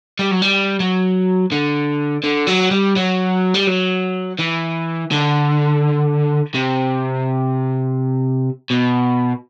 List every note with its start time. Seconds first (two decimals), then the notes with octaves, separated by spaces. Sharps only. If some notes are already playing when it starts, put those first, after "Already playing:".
0.19 G3
0.31 F#3
0.42 G3
0.80 F#3
1.52 D3
2.24 D3
2.48 F#3
2.71 G3
2.96 F#3
3.54 G3
3.67 F#3
4.39 E3
5.11 D3
6.55 C3
8.71 B2